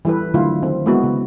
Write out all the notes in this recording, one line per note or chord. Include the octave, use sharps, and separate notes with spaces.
E3 G3 E4 A4 B4
D3 D#3 F#3 A3 E4 F4
D#3 C4
G#3 A#3 B3 E4 F#4
C#3